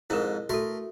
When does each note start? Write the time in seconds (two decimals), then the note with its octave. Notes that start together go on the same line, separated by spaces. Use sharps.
0.10 F2 G#2 D#4 E4 A#4
0.49 A3 F#4 A4 A#4